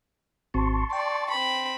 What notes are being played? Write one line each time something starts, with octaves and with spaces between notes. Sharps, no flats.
G#1 C4 F#4 A5 C6 C#6
D5 G5
C4 B5